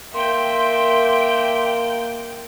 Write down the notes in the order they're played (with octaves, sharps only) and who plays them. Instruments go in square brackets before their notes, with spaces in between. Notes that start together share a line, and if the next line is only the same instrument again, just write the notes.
[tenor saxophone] A#3 [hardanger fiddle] E5 [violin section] G5 G6 [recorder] C6